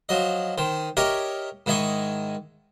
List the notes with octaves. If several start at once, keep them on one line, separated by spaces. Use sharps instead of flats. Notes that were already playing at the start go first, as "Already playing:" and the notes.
F3 F#3 D#5
D#3 C5
G4 A#4 C#5 D#5 E5
G#2 D#3 E4 D#5 G#5 C#6